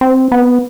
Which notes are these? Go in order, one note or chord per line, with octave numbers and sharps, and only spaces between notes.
C4
B3